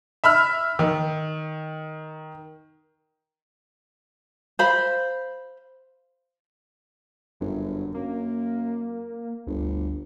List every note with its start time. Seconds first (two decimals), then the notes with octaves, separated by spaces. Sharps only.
0.24 E5 B5 E6 F6
0.79 D#3
4.59 C5 F5 B5
7.41 G1 F#2
7.95 F#2 A#3
9.47 G1 D2